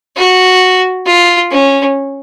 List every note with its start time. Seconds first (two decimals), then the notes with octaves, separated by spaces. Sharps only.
0.17 F#4
1.06 F4
1.51 C#4